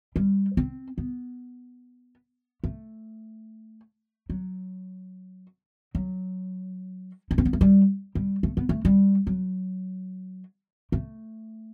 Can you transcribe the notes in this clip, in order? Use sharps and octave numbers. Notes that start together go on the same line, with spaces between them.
G3
C4
B3
A3
F#3
F#3
D#4
C4
B3
A3
G3
G3
A3
B3
A3
G3
F#3
A3